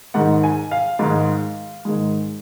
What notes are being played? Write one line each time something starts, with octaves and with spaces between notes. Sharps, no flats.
G#2 D#3 G#3 F#5
G#5
F5
G#2 D#3 G#3
G#2 D#3 G#3